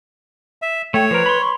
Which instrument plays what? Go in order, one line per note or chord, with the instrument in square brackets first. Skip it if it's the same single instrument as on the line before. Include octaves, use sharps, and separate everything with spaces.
[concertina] E5
[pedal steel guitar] A3 [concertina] C#5 [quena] G5
[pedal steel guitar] F3 A#4 [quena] B4
[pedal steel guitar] B5 C6
[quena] C#6